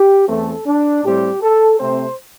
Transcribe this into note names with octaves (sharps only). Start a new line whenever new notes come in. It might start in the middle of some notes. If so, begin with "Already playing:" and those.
Already playing: G4
E2 E3 A3 C4 A4
D4
A2 G3 C4 G4
A4
C3 A3 C4 C5